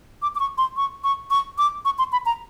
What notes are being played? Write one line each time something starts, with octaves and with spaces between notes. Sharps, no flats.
D6
D6
C#6
C6
C#6
C#6
C#6
D6
C#6
C6
B5
A#5